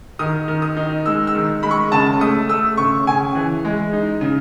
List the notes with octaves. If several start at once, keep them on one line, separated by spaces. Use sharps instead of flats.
D#3 D#6
D#3
D#6
D#4
G#3 E6
E6
D#3
G#3 B5
C#6
C#3 A5
A3 D#6
A3 E6
C#3 C#6
C#3 G#5
E3
G#3
D#4
C#3